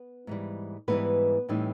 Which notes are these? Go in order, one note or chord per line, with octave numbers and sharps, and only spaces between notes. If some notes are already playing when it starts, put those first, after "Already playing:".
Already playing: B3 B4
G#2 E3 G3
G#2 E3 G3 B3 B4
A2 E3 G3 C4 D#4